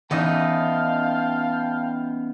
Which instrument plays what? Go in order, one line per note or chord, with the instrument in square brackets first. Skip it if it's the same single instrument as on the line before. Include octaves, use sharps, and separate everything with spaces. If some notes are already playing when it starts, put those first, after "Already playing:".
[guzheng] E3 D#4 [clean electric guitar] B3 C#4 D#5 [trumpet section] F5 G5 A5